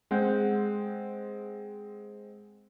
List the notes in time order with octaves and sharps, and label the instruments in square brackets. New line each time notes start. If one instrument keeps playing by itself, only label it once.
[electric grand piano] G#3 C4 F#5 G6